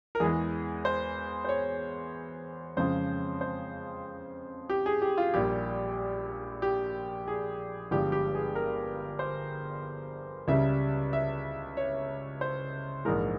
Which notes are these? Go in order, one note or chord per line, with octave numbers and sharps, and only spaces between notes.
A#4
E2 E3 G#3 G#4
C5
C5
C#5
F2 C#3 F3 G#3 C5
C5
G4
G#4
G4
F4
A#1 A#2 G3 G4
G4
G#4
G1 G2 F3 G#3 G4
G4
G#4
A#4
C5
C#2 C#3 G3 E5
E5
C#5
C5
A#1 G#2 E3 G#3 A#4